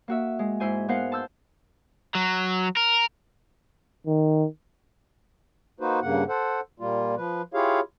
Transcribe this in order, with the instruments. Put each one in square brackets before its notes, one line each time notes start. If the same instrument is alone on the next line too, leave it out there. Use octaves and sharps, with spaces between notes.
[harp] A#3 F#4 E5
G#3
G#2 E4 C5 G#5
B3 A#4 C5 F5 F#5
A5 C6 E6 G6
[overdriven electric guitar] F#3
A#4
[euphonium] D#3
[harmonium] A#3 D#4 F#4 B4 C5
G2 C#3 A#3 F#5
A4 C5 F#5
A#2 G3 A#3 F4
F3 B4
E4 F4 G4 G#4 C#5 F5